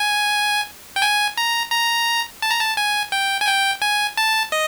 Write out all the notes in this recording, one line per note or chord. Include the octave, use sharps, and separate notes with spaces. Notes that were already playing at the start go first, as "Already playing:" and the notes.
Already playing: G#5
G5
G#5
A#5
A#5
A5
A#5
A5
G#5
G5
G#5
G5
G#5
A5
D#5